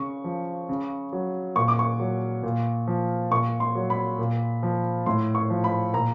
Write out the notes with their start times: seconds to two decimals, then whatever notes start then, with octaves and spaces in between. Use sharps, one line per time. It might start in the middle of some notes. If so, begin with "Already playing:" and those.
Already playing: C#3 C#6
0.24 F3
0.69 C#3
1.13 F#3
1.56 A#2 C#6
1.68 D6
1.79 C#6
2.00 F#3
2.43 A#2
2.87 F3
3.31 A#2 C#6
3.60 C6
3.75 F#3
3.90 B5
4.19 A#2
4.63 F3
5.06 A2 C6
5.35 C#6
5.50 F3
5.64 B5
5.93 A#2 A#5